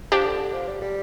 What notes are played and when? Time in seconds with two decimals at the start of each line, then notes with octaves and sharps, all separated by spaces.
0.12 F3 D4 G4
0.25 D3
0.39 D3
0.54 F3
0.68 G3
0.81 G3